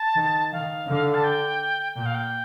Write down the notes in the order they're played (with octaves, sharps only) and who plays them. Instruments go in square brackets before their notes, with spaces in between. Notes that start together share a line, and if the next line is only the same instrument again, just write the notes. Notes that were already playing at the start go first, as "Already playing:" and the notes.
Already playing: [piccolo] A5
[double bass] D#3
[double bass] D#3 [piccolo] F5
[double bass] D3
[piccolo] A5
G5
[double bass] A#2 [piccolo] G5
[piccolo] F5
G5